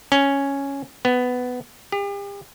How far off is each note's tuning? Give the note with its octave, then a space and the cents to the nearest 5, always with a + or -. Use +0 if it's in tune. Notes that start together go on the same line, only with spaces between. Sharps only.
C#4 +0
B3 +10
G4 +40